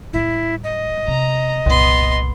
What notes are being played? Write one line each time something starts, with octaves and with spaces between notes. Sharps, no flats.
A2 G3 E4
D#5
C3 A#5
F#1 C2 A#2 B3 C6